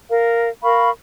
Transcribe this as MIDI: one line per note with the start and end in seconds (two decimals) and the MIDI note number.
0.10 0.48 70
0.10 0.48 77
0.63 0.90 70
0.63 0.90 77
0.63 0.90 83
0.63 0.90 85